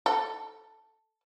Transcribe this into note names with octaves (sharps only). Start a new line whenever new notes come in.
A4